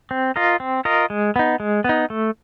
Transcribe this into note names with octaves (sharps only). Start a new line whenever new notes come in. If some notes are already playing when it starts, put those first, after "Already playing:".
C4
F4 A#4 D#5
C4
F4 A#4 D#5
G#3
B3 D#4
G#3
B3 D#4
A3